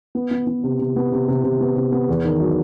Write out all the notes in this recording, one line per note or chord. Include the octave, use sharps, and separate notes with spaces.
B3
B3
B3
C3
C3
B3
C3
C3
C3
B3
C3
B3
E2
D#3
F#3